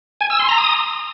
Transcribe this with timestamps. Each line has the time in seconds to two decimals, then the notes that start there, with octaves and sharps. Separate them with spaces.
0.21 G#5
0.30 E6
0.39 C6
0.49 A#5
0.58 D#6